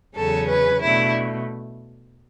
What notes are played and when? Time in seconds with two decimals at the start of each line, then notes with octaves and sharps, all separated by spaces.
0.15 E2 C#3 F#3 C#4 A4
0.49 B4
0.82 B2 A3 D4 E4